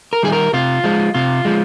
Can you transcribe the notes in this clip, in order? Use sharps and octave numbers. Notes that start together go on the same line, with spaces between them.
A#4
D#3 G3 G#4
A#4
C3 F4
F3 G#3
C3 F4
F3 G#3